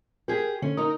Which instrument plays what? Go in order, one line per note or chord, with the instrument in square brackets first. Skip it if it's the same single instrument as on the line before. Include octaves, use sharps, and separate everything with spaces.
[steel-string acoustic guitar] G4 G#4 [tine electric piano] A#4
[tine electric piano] D3 [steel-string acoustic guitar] C#4
[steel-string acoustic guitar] D#4 A#4 [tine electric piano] D#6